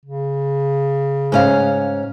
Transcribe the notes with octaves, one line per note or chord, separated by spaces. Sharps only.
C#3
G#2 C#4 F5